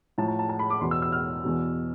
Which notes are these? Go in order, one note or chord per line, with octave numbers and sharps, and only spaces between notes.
A2 F3 A5
A5
A5
A5
B5
D6
E2 B2 C6
E6
E6
F6
E2 B2